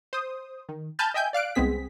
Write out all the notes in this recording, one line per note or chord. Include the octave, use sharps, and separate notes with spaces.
C5 D#6
D#3
G#5 A5 B5 F6 G6 A6
D#5 E5 G5 G#5 G6
D5 F5 F#6 D7
C2 G#3 B3 C4 G#4 B6